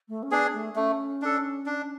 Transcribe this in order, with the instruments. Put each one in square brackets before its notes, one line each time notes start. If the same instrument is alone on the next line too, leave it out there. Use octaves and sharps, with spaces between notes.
[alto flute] A3
C#4
[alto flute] B3 [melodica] D4 G#4
[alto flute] A3
[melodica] A3 [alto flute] C#4
[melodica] D4 A4
D4